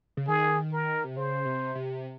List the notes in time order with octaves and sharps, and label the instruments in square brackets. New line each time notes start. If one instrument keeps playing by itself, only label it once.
[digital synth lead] C#3
[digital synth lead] D#3 [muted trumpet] G#4
[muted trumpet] A#4
[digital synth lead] C3
[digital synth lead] C#3 [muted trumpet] C5
[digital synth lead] C3
C3